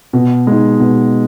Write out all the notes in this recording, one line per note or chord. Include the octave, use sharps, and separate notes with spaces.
B2
G#3 D#4
B2